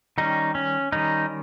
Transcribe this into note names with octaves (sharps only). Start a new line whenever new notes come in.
D#3 G3 C#4 D#4
C#4
D#3 G3 C#4 D#4